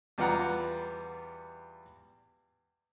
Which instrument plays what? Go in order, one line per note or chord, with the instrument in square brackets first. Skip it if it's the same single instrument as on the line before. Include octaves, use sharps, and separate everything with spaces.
[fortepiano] E2 G3 B3 F4 F#5 A#5